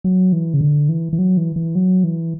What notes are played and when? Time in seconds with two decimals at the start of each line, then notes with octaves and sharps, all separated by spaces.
0.04 F#3
0.33 E3
0.54 C#3
0.61 D3
0.89 E3
1.13 E3
1.19 F#3
1.37 E3
1.56 E3
1.75 F#3
2.04 E3